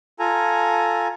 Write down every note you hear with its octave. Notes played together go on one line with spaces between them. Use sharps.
F4 A4 G#5 A#5